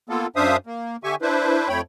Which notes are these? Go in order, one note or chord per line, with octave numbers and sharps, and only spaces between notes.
A#3 B3 F4 A4
F#2 D4 C5 E5 F5 D#6
A#3
D3 G4 E5 G#5 C#6
D4 E4 B4 C5
F2 A3 C#5 G5 B5